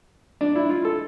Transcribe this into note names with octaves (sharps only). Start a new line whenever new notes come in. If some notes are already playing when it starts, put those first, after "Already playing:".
D4
E4
F4
A4